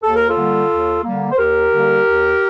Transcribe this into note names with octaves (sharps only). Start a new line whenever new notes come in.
D#2 A4
A#4
F4 A4
D3 G3 A#3
D#2
D3 G3 A#3
C5
D#2 G4 A#4
D3 G3 A#3
D#2